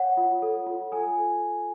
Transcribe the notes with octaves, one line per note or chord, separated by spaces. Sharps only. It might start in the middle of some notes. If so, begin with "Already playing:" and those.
Already playing: C#5 F#5
F4
A4
F4
A4 G#5